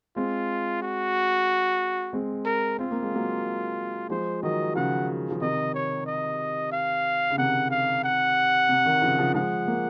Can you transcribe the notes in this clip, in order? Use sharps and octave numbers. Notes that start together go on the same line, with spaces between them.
G#3 C4 F4
F#4
G#3 C4
A#4
C4 F4
A#3
G#3
F#3 A#3
F3 G#3 C5
D#3 F#3 D#5
C#3 F3 F#5
F3
C3 D#3 D#5
C#5
D#5
F5
C#3
C3 D#3 F#5
F5
F#5
C3
C3 D#3
C#3 F3
C#3 F3
F3 G#3 F#5
A#3